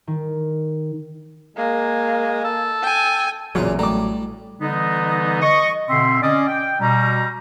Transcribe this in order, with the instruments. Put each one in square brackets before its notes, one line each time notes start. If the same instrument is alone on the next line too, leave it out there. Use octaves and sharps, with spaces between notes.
[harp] D#3
[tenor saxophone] G#3 [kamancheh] A#3
[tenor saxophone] A4
[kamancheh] G5 G#5
[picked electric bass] A1 E3 F#3 [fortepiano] E2 A#2 [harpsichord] C#3 F4
[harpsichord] G3 A3 [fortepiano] A#5 D6
[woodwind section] D3 E3 G3 B3 D#4
D#5 C#6
B2 D3 C4 E5 C6
C#4 D5 D#5
G5
B2 G3 A#5